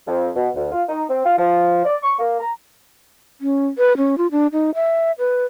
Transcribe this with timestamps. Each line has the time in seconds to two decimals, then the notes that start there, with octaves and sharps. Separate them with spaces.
0.07 F2
0.36 B2
0.56 D2
0.72 F4
0.89 D#4
1.09 C4
1.25 F4
1.38 F3
1.85 D5
2.03 C#6
2.19 A#3
2.40 A#5
3.41 C#4
3.78 B4
3.97 C#4
4.18 F4
4.32 D4
4.52 D#4
4.75 E5
5.19 B4